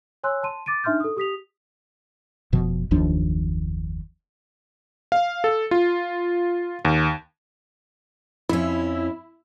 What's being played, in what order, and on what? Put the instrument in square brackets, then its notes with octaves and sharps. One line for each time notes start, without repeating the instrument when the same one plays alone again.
[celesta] C#5 G#5 C6 E6 F#6
A5 C6 D#7
D6 A6 D7 D#7
D4 D#4 E5 C6 F6 G6
A4 D#6
G4 D#6 B6 F7
[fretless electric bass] F1 B2 F3
F#1 D#2 F3 D4
[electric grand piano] F5
A4
F4
D#2
[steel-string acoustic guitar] F2 C#4 [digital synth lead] E4